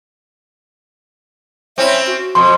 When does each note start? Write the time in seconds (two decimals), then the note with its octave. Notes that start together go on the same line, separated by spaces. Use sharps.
1.78 C4 C#4 E4 E5
2.07 F#4
2.35 F2 B2 C6